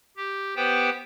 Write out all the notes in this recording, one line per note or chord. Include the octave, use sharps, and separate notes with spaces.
G4
B3 G4 B4 C5 G5